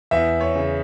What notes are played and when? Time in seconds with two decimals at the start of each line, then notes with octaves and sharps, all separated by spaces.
0.11 E2 E5
0.41 C#5
0.56 C#3